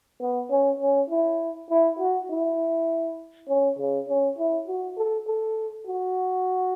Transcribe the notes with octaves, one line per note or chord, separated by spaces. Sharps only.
B3
C#4
C#4
E4
E4
F#4
E4
C#4
C#3
C#4
E4
F#4
A4
A4
F#4